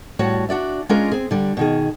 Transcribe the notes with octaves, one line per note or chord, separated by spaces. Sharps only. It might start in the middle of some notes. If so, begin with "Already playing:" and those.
A2 G3 F#4 C#5 A5
D4 F#4 D5 E5
G#3 C#4 D4 F4 G#4 A#4
C4 G#4
D3 G3
B2 D#3 G#4